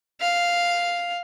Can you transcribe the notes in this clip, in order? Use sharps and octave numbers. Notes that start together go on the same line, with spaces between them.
F5